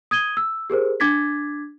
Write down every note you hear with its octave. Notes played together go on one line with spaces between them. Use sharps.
D#6 G#6 D#7 G7
E6
G4 G#4 A#4 C5
D4 D6 G#6 A6 B6